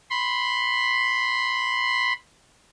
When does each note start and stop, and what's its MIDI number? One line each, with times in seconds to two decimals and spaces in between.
0.10 2.13 83
0.10 2.13 84